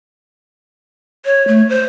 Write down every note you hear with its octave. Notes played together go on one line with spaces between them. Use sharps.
C#5
A3
C5